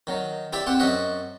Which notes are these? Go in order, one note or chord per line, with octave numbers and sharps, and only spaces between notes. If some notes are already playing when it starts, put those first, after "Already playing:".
D#3 F#3
E4 G4 C5 D5 E5
C4 G4 C5 F#5
F#2 F#4 C5 D#5 E5 F#5